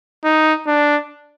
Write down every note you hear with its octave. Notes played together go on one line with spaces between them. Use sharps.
D#4
D4